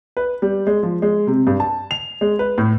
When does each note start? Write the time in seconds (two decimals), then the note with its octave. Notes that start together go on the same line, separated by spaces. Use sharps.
0.17 B4
0.42 G3
0.67 G#3
0.83 F3
1.02 G#3
1.27 C3
1.47 G2
1.60 A5
1.91 F7
2.21 G#3
2.39 B4
2.58 A2